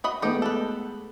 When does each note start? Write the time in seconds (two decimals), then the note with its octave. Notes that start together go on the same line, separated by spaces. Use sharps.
0.04 F#4 D#5 B5
0.22 G#3 A3 B3 D#4 G4 D#5
0.42 A4 B4